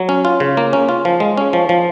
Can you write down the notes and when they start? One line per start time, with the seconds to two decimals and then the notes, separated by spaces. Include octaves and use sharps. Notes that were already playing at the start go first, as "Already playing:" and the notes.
Already playing: F#3
0.09 C#4
0.25 F4
0.40 C#3
0.57 A#3
0.73 C#4
0.89 F4
1.05 F3
1.20 G#3
1.37 C#4
1.53 F3
1.69 F3